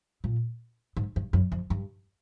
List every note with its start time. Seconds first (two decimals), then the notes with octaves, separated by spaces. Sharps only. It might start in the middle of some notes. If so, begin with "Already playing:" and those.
0.24 A#2
0.97 G#2
1.16 G2
1.33 F#2
1.52 F2
1.70 G2